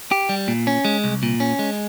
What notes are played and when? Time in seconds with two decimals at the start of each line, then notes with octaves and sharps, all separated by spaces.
0.11 G4
0.29 G3
0.48 A#2
0.67 C#4
0.85 G#3
1.04 C2
1.23 A#2
1.40 C#4
1.59 G#3